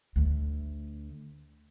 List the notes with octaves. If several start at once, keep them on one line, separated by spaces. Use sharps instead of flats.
D2 A3